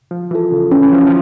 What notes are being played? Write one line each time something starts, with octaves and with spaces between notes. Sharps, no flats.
F3
E3 F4 A4
C#3
E3 C#4
E3
F3
F3